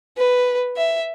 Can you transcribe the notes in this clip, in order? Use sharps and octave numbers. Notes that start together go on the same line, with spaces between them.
B4
E5